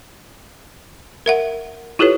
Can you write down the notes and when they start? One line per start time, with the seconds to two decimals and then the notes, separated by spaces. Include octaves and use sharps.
1.26 A#4 E5 F#5
1.99 E4 F4 G4 A4 B4 C#5